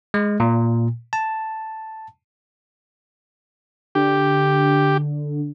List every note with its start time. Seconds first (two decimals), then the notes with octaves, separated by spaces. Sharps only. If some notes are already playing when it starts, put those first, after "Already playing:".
0.14 G#3
0.40 A#2
1.13 A5
3.95 D3 G4